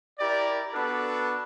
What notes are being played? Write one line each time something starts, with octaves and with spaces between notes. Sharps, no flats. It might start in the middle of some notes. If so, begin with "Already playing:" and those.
E4 G4 A#4 D5
B3 D4 F#4 A4 B4